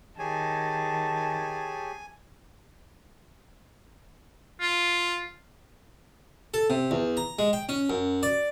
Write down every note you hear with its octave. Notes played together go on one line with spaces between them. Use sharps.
D#3 G4 G#4 C#5 G#5 A5
F4
A4
C3
E2
A#5
G#3
G5
C#4
F#2
D5